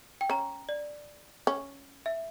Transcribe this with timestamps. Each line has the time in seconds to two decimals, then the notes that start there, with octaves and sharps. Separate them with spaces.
0.21 G5
0.30 C#4 A#5
0.69 D5
1.47 C#4
2.06 E5